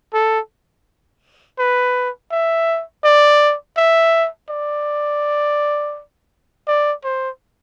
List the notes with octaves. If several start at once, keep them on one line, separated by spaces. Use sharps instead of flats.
A4
B4
E5
D5
E5
D5
D5
C5